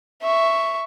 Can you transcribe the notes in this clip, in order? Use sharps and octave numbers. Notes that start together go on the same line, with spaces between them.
E5 C#6